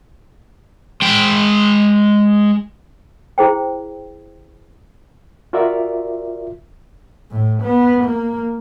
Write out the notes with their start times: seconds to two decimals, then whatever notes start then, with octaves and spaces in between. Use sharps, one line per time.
1.02 G#3 G5
3.38 E4 G#4 C5 G5
5.53 F4 F#4 A#4 D5 E5
7.31 A2
7.63 B3
8.04 A#3